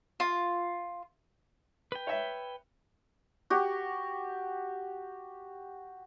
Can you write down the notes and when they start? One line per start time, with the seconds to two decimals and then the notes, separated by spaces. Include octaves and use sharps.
0.20 F4
1.92 B4 G5
2.07 C#5 E5
3.50 F#4 G4